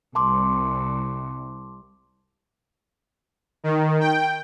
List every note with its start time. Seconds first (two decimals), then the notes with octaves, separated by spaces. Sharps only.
0.15 C2 A5 C6 D6
3.64 D#3
4.00 G5